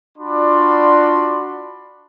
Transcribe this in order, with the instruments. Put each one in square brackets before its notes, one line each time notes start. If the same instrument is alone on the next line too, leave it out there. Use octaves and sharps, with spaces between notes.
[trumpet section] D4 F4 F#4 D5 B5 C6